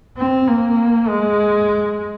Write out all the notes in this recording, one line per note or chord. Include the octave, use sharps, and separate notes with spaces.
C4
A#3
G#3